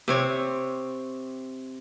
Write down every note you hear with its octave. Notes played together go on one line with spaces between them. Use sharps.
C3 C4 C#5